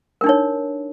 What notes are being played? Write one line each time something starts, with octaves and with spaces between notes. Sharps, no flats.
D4 D#4 A#4 C#5